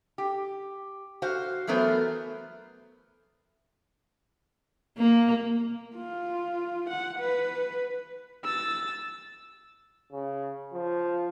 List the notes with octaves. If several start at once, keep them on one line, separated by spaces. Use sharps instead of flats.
G4
F#4 C5 F5
E3 F#3 A3 B3 A#4 C5
A#3
F4
F#5
B4
E6 A6
C#3
F3